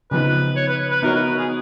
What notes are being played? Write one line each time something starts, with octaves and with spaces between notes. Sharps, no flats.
C#3 F3 B3 D#4 B4
C#5
B4
B4
B3 D#4 F#4 A#4 C#5
B4
G#4